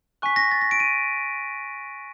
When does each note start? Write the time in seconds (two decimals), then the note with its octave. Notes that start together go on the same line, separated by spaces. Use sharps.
0.22 G#5 C#6 F#6 B6
0.36 A#6
0.51 A6
0.61 A#6
0.71 D7
0.80 D#7